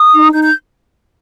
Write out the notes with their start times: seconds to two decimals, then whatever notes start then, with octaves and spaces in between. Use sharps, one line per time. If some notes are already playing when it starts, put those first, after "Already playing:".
Already playing: D#6
0.13 D#4
0.33 D#4 G6
0.44 G6